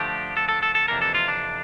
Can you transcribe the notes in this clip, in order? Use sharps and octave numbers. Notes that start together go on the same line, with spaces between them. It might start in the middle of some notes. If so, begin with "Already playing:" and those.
Already playing: D3 F3 A3 D4 G4
A4
A4
A4
A4
F2 C3 E3 A#3 D4 A#4
A4
F4
D4